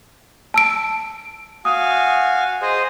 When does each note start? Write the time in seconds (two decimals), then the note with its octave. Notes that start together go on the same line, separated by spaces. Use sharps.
0.54 A5 E6 D7
1.65 F#4 F5 G#5 D#6
2.62 G#4 C5 D#5